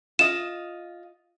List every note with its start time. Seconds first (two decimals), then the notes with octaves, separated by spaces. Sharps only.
0.19 F4 D#5 E7